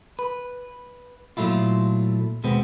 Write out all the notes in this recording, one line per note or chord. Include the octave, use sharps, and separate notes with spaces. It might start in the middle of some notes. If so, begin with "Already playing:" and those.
B4
A#2 F#3 A3 E4 F4
D#2 B2 G#3 B3 C4